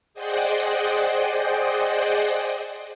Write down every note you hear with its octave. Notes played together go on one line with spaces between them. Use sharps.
G#4 C5 D5 D#5 F#5 G5